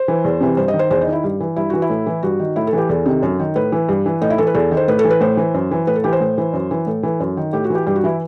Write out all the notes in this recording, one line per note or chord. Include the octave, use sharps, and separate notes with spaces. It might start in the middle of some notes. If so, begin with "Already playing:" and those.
Already playing: C5
E3
E2
C3 E3
G2 C5
D#5
D#3
C5
E2 C5
D#4
D#3
E4
G2
E3
G2 E4
E3 F#4
E4
A2
E3
G2 F#4
D#3
A2 E4
A4
E3
G4
E2 A4
C3 D#3
F#2
D#3
A2 B4
E3
G2
E3
A2 D#4
E4
E3 A4
B4
E2 A4
D#3
C5
A2 B4
A4
E3
B4
A2 C5
E3
F#2
E3
A2 B4
A4
E3 G4
C5
A2
E3
F#2
E3
A2 A4
E3
F#2
D#3
A2 G4
F#4
E3 G4
G2 G4
F#4
E3 E4